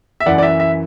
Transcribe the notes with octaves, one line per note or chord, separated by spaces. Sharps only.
E5
F#2 E3 D5 F#5
D5
E5
E5